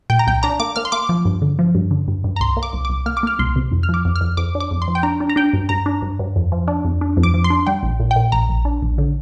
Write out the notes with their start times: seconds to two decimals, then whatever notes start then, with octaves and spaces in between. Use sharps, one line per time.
0.10 A#2 G5
0.19 A#5
0.27 C2 G5
0.43 D4 A#5
0.60 A#3 D6
0.76 A#3 F6
0.85 C6
0.92 A#3 D6
1.09 F3
1.25 G2
1.42 D3
1.59 F3
1.75 G2
1.91 D3
2.08 G2
2.24 G2
2.36 A#5
2.40 C2 C6
2.57 A#3
2.63 D6
2.73 C2
2.85 C2 D6
3.06 A#3 F6
3.17 D6
3.23 A#3 F6
3.39 C2 C6
3.56 C3
3.72 F2
3.83 F6
3.89 F3
3.94 D6
4.05 F2
4.16 F6
4.21 F2
4.37 F2 D6
4.55 D4
4.60 D6
4.71 F2
4.82 C6
4.88 F3
4.95 G5
5.03 D4 A#5
5.20 D4
5.29 A#5
5.36 D4 G5
5.53 G2
5.69 G2 A#5
5.86 D4
6.02 G2
6.19 G2
6.36 F2
6.52 F3
6.68 D4
6.85 F2
7.01 D4
7.17 F2
7.23 D6
7.34 F3
7.44 C6
7.50 D4
7.66 G3 G5
7.83 A#1
8.00 A#2
8.11 G5
8.16 A#2
8.32 A#1 A#5
8.49 A#1
8.65 D4
8.82 A#1
8.98 D3